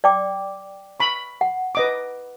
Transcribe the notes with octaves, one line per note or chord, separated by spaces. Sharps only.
D5 G5 D6
B5 C#6
F#5
B4 D#5 D6